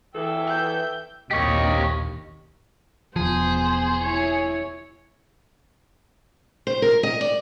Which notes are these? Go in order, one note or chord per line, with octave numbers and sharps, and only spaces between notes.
E3 A4 E5 G5
G6
A#1 D#2 C3 A#3 G4 C#5 D#5
E1 F3 B3 G#4 C5
E4 C#5
C5
A#4
D#5
D5